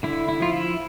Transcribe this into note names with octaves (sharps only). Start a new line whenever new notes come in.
D3 E4
E4
F3 F4
E4